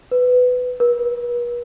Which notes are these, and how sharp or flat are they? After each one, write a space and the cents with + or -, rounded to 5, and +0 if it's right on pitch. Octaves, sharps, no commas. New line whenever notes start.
B4 +15
B4 -45